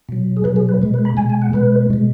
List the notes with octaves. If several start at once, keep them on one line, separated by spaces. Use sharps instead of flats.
B2 F#3
G#4
B2 F#3 B4
G#4
B4
B2 G#3
B4
B5
B2 G#3 G#5
G#5
F#5
B2 G#3 B4
B2 G#3